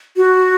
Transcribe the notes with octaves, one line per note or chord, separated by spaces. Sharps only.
F#4